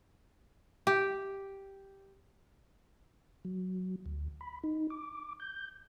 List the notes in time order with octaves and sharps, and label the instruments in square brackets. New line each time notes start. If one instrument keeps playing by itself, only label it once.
[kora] G4
[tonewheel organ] F#3
D2
B5
D#4
D6
G6